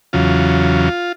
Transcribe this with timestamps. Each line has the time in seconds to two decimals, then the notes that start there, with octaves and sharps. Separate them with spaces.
0.13 E2 C#3 F#3 F4